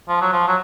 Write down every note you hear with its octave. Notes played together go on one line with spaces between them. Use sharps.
F3
F#3
F3
F#3